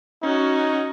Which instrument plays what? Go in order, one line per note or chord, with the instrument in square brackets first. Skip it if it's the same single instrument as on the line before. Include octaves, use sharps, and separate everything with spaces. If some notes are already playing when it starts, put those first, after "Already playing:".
[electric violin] C#4 F#4 [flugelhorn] D#4